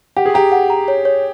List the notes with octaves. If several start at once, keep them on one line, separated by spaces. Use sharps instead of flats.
G4 F#5
G#4
G4 A#5
F#5
A#5
C#5
C#5